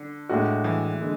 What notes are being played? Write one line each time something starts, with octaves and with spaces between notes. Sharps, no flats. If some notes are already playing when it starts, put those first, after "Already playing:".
Already playing: D3
A2 G#3 D4 F#4
E3
D3 G#3